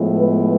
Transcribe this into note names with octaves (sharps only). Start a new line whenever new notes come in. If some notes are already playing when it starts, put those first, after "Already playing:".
Already playing: A2 F3 G#3 B3
B4